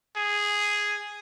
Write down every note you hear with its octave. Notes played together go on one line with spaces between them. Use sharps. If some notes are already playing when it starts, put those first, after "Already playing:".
G#4